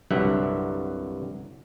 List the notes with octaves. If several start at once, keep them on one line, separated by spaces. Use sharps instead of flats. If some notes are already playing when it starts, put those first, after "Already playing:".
C2 G2 D3 F#3 E5 F#5